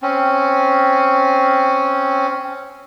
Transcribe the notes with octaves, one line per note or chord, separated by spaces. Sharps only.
C4 C#4